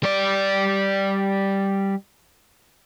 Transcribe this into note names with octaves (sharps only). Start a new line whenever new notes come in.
G3 D5